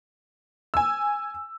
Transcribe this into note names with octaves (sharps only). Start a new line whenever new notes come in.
G#5 E6